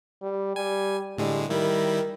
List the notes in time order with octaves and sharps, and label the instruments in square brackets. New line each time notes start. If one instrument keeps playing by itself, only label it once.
[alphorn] G3
[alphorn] G3 [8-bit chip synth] G#5
[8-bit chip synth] A2 D3 G#3 [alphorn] G3
[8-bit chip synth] D#3 G3 E4 [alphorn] A#4